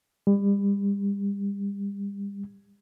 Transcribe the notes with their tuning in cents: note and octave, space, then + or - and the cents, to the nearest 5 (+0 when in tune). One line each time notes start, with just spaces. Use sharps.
G3 +35